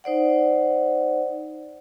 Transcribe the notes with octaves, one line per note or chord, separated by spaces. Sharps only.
D#4 C5 D5 F#5